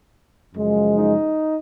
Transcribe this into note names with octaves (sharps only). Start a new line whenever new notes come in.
F#2 C#3 F3 G#3
D#4